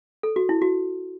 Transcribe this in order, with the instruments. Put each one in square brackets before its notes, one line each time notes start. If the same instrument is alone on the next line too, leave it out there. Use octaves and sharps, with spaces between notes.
[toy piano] A4
F#4
E4
F#4